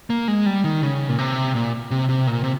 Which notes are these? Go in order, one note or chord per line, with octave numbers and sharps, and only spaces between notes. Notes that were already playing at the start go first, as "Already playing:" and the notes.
A#3
G#3
G3
D#3
C#3
A#2
C3
A#2
C3
C3
A#2
C3